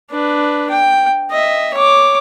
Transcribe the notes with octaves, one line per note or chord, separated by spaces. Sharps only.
D4 B4
G5
D#5 E5
C#5 D6